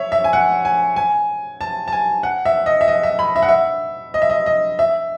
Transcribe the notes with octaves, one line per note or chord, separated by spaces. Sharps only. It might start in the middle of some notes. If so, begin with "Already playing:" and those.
Already playing: C#5 E5
E5
G#5
F#5
G#5
G#5
A5
A5
G#5
F#5
E5
D#5
E5
D#5
E5
B5
E5
F#5
E5
D#5
E5
D#5
D#5
E5